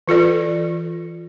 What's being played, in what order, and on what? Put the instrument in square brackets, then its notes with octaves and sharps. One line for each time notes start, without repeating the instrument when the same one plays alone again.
[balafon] E3 F4 A4 D5